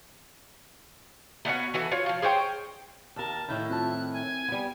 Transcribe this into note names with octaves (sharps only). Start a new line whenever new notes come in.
A3 B3 C#4 F#4
E3 F#4 A4 B4
F4 F#4 C#5
F3 F4
G#4 C5 C#5 G5
D#2 A#4 A5
A2 D#3 E4 G6
C4 F4 A5 F#6
C4
G#5
G3 B3